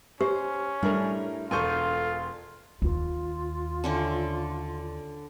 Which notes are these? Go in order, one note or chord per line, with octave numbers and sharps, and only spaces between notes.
C#4 G4 C5
A2 G3 D4 E4 A#4 A#5
E1 F4 A4 G#5 C#6 G6
D#2 F4
D3 C#4 E4